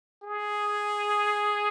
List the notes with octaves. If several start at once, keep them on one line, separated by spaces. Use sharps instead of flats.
G#4